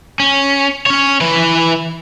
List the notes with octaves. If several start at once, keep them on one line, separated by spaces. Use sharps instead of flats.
C#4
C#4 C#5
E3 B4